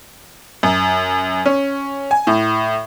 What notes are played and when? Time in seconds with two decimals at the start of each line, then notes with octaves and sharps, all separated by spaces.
0.63 F#2
1.46 C#4
2.11 G#5
2.27 A2